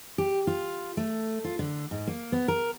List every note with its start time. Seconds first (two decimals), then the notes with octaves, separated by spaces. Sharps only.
0.18 G4
0.47 F4
0.97 A3
1.44 F4
1.59 D3
1.91 G#2
2.07 A#3
2.32 B3
2.48 A#4